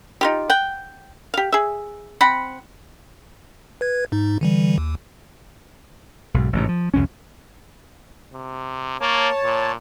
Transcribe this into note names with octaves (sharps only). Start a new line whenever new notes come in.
D#4 F4 G4
F#5 G5
G4 F5
G#4 E5
C4 F#5 B5
B4 G#6
G#2 D#4
D3 E3 G3
D#2
B1 G#2
A1 G#2 C3
F3
C2 F2 C#4
C3
A#3 C#5 A5
A#2